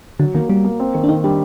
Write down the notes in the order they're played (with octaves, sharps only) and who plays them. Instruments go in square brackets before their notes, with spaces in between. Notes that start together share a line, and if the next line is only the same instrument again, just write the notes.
[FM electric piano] D3 [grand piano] F#3
[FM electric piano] D#3 [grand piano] A#3
[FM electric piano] G3 [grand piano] A#3
[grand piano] A#3
C4
D#3
[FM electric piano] D4
[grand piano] D#3 [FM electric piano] D#4
[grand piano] G3 [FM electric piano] D4